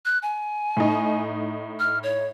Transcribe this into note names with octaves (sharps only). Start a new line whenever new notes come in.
F#6
G#5
A2 D#4
F6
C#5